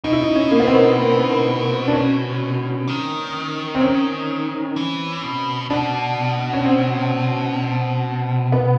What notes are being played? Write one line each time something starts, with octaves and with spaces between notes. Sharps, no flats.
B2 D#4
E4
D#4
C#4
A#3
B3
C4
D4
C#4
D#3
C4
C#4
E3
B2
B2 D4
C#4
C4
B3